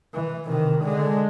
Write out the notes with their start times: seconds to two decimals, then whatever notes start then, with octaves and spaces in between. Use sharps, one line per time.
0.14 E3
0.47 C3 D#3
0.81 D3 G#3